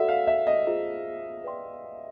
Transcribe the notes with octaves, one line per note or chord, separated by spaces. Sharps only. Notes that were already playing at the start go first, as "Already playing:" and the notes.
Already playing: F#4 A4 D5 E5 F#5
F5
E5
D#5
F4 G#4 C5
B4 D5 G5 C6